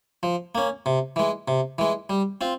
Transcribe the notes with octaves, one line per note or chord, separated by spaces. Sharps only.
F3
A#3 C#4
C3
E3 G#3
C3
E3 G#3
G3
C4 F4